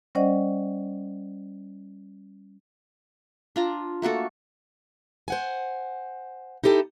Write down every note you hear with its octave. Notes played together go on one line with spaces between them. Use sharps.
G3 C#4 C5 D5 D#5 F#5
D4 F4 A#5
A3 A#3 F#4 A4
C5 F#5 G#5
D#4 E4 G4 A4